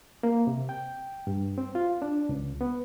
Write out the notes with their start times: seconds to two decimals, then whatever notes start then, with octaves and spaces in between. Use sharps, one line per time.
0.23 A#3
0.47 C3
0.69 G5
1.27 G2
1.58 C4
1.75 F4
2.02 D4
2.29 C#2
2.61 B3